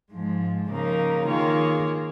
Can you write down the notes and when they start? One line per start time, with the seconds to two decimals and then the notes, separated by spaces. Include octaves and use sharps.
0.12 G#2 F3 G#3
0.69 C#3 F3 A#3 D#4 A#4
1.26 D#3 A#3 F4 G#4 C#5